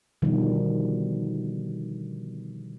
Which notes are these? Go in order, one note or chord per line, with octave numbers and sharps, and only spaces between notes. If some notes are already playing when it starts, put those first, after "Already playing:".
B2 D3 D#3 F3 G3